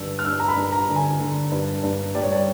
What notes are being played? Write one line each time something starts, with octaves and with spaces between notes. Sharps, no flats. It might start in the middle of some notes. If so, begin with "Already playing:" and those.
Already playing: G2 D3 E6
F6
G2 E6
A#5
B5
G2
A#5
D3
G#5
D3
G2
G2
G3 D5
C#5
D5